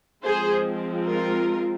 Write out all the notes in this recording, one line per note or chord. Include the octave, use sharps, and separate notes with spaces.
F3 G#3 C4 G#4 C5
F4 A#4